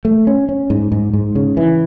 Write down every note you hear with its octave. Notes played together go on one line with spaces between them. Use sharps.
A3
C#4
C#4
G#2
G#2
G#2
C#3
E3